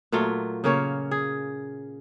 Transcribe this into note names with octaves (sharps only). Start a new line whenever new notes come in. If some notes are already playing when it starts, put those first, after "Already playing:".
A#2 F#3 A3 F4
C#3 A#3 C#4 C#5
G#4